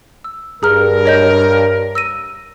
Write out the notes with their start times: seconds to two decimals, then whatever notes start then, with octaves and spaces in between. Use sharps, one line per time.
0.24 E6
0.63 G2 G#4 A#4 A#5 F6
1.06 C#5 D#5 G6
1.95 E6 A#6 D#7